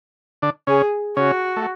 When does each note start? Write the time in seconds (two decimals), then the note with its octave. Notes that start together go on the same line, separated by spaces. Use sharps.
0.42 D3 D4
0.67 C#3 C#4 G#4
1.17 C#3 C#4 F#4
1.57 A3